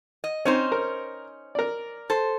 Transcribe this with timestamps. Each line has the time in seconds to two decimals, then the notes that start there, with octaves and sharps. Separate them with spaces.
0.24 D#5
0.45 C4 C#4 D#4 C5
0.72 A#4
1.55 A#4 D5
2.10 A4 C5